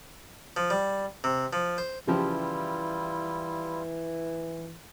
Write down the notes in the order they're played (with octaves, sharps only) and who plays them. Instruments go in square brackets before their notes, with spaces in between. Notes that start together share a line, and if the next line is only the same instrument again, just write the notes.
[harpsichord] F3
G3
C3
F3
C5
[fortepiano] C#3 F3 G4 [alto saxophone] E3 [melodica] G3 E4 F4